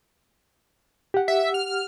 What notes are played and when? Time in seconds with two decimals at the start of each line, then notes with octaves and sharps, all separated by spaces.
1.14 G4 F#5
1.28 E5
1.54 F6